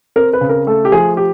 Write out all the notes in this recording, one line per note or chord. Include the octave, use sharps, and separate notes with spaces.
C4 A#4
B4
C#3
A#4
A3 A4
G4
F3 G#4
G4